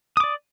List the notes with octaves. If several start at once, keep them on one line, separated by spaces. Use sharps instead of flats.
D5 D6 D#6